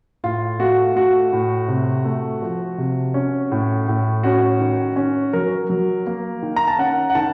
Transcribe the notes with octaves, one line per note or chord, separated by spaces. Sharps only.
A2 F4
A3 F#4
A3 F#4
A2
C3
A3
F3
C3
C#4
A2
A2
C#4 F#4
D#3
C#4
F#3 A#4
F#3
A#3
D#3
A#5
A5
C#4 F#5
F#5
D#3 A5